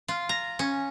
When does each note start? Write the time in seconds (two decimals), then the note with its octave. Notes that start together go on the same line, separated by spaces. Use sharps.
0.08 F4
0.29 A#5
0.59 C#4